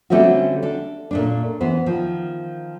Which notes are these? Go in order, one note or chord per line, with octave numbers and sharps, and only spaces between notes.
D3 G3 A3 C4 C#4 F#4
D4 A4
A#2 A3 D4
E3 B3 C5
D#3 F3